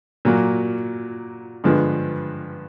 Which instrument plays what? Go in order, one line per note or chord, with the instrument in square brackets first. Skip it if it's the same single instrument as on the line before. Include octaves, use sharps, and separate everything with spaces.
[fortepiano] A#2 F#3 A#3
G2 D3 F3 G#3 B3